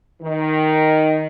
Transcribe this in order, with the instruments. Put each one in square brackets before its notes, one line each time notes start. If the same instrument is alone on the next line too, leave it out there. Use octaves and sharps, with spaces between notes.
[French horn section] D#3